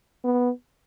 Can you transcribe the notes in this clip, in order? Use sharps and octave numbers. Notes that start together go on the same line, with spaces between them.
B3